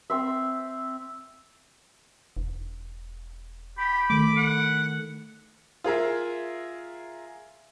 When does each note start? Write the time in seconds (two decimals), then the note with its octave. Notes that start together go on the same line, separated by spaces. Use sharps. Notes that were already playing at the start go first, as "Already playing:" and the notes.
0.10 C4 C5 E5
2.37 E1
3.78 G4 B5
4.10 D#3 A3 D6
4.37 F#5
5.84 F4 G#4 A#4 E5